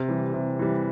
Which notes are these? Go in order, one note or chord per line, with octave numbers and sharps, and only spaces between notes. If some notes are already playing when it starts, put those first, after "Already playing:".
Already playing: C3
E3 G3
C3
E3 G3